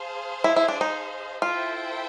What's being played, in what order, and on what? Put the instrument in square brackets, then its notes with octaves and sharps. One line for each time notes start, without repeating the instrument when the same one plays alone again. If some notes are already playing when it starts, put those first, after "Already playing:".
Already playing: [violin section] G#4 C5 F5 A5
[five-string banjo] E4
E4
D4
D#4
[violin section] E4 A4 C5 E5 G5 [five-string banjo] F4